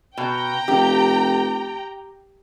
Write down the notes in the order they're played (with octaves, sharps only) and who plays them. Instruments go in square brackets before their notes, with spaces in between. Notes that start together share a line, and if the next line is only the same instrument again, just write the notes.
[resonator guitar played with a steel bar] B2 [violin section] G5 A#5
[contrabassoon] F1 [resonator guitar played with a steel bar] G4